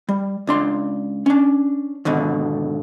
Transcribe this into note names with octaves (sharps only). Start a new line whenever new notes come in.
G3
C#2 D4 C6
C#4 D4
G#2 B2 D3 D#3